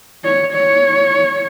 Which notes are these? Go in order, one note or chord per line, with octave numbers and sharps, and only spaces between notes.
C#5
C#5